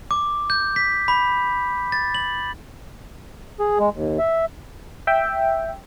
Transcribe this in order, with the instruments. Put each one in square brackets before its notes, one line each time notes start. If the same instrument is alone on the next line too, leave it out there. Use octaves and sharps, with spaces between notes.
[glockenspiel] D6
G6
B6
B5
A6
F#7
[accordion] G#4
G#3
D#2
E5
[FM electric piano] E5 G5